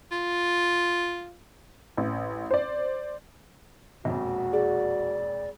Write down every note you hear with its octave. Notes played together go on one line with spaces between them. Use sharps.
F4
A1
C5 D5
E1 A#1 F2 F#4
G#4 D5